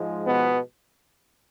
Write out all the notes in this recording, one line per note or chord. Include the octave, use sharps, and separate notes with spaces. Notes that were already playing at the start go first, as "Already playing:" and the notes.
Already playing: G#2 F3 G#3
B2 B3